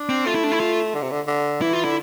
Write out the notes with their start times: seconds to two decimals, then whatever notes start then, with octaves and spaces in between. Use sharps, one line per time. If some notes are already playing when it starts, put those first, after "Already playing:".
Already playing: D4
0.09 C4
0.26 A3 F4
0.35 E4
0.44 D4
0.52 E4
0.60 F4
0.94 D3
1.02 C3
1.11 D3
1.27 D3
1.62 E3 E4
1.73 F4
1.84 D3 E4